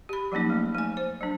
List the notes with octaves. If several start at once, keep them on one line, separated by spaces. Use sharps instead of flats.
G4 B5
F3 F#3 A#3 C#4 D#4
A3
A3 G#5
C5
F#3 D4